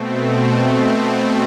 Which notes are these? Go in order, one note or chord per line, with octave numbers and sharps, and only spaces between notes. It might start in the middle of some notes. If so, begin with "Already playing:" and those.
Already playing: B2 A3 C4